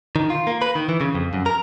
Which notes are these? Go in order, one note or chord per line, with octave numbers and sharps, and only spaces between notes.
D#3
F4
A#3
B4
D#3
E3
C#3
F2
F#2
A#4